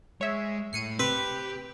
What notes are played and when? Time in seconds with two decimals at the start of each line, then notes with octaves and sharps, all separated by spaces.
0.21 G#3 C#5 E5
0.73 A2 C7 C#7 D#7
0.99 C4 G4 B4